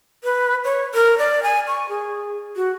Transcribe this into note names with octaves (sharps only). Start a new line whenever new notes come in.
B4
C#5
A#4
D5
G#5
C#6
G#4
F#4